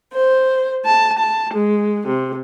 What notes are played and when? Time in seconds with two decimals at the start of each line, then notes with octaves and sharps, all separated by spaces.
0.12 C5
0.85 A5
1.18 A5
1.53 G#3
2.07 C3